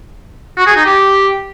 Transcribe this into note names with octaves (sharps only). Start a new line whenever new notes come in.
F#4
G#4
D#4
G4